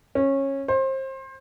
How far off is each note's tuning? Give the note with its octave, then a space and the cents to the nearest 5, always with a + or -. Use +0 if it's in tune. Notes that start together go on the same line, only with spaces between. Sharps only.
C#4 -20
C5 +30